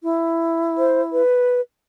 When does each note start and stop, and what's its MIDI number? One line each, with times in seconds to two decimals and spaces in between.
0.03 1.22 64
0.78 1.02 72
1.13 1.61 71